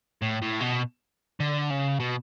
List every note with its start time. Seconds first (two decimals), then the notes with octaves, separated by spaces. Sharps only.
0.22 A2
0.42 A2
0.61 B2
1.40 D3
1.70 C#3
2.00 B2